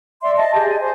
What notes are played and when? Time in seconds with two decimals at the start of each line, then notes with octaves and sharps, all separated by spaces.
0.22 D5 E5 C6
0.37 D#5 A5
0.54 G4 G#4 D#5
0.68 G#5
0.81 C5